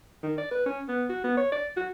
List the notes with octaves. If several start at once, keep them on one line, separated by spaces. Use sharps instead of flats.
D#3
D5
B4
C#4
B3
F#4
B3
C#5
D5
F#4